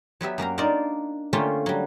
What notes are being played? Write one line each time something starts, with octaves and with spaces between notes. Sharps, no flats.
F#3 B3 G4 E5
F#2 A#3 A#4 A#5
D4 D#4 F4 A#4 D5
D3 A3 A#3 C#4 F4 G4
F#3 G3